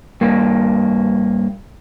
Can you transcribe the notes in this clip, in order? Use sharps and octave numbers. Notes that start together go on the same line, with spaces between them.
G2 A#3